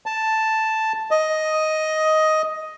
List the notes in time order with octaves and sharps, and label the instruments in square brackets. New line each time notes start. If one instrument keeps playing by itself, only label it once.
[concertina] A5
D#5